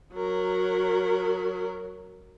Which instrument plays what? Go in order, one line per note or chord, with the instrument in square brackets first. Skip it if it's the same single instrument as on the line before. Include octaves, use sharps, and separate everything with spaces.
[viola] F#3 A#4